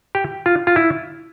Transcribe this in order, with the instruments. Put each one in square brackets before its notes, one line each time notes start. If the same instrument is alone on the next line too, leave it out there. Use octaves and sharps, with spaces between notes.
[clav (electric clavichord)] G4
F4
F4
E4